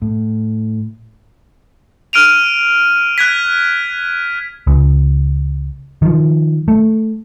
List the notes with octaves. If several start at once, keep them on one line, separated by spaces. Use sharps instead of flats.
A2
F6 D7 D#7 F7
F#6 G#6 B6
C#2
D#3 F3
A3